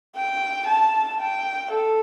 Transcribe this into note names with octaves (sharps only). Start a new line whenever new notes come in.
G5
A5
G5
A4